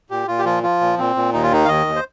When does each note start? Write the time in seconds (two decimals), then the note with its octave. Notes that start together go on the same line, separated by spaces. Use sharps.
0.10 A#2 G4
0.28 A#2 F4
0.38 G4
0.45 F3 F4
0.63 F3 F4
0.81 A#2
0.98 A#2 C4
1.16 A#2
1.33 D#2 D#4
1.43 F4
1.51 D#3 D#4
1.65 F5
1.68 D#2 D#5
1.86 D#2
1.96 C5